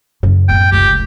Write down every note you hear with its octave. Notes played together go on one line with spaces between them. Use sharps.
F#2 C#3
A2 B3 G5
F1 C#2 G4